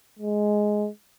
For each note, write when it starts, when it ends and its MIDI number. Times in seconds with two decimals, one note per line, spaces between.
0.19 0.88 56